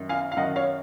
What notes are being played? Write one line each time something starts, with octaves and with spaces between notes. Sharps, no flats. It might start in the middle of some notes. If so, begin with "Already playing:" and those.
Already playing: F#2 D#3
F5 G#5
F5
F#2 D#3 D#5 F#5
C#5 F5